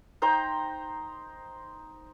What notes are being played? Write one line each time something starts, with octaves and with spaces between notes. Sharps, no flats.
D#4 C5 G5 A#5